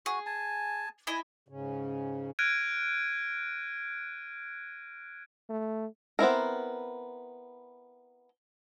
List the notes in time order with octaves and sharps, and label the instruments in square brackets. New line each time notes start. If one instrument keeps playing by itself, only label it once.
[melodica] F#4 [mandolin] G#4
[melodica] G#5 A5
[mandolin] E4 D#5 [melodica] G#5
[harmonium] G#2 C#3 C#4
[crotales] F6 F#6 G#6 A#6 D7 D#7
[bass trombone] A3
[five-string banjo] B3 C4 E4 A#4